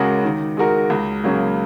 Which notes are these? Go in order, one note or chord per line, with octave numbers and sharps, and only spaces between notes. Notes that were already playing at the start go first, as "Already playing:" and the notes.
Already playing: C#2 C#3 G#3 F#4 A#4
D#3
G#3 F#4 A#4
C#2
C#3 F#3 A#3